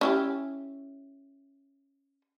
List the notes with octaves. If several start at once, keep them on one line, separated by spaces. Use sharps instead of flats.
C#4 E4 G4